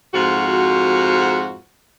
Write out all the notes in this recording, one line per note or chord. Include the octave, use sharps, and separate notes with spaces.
F2 G#2 F4 F#4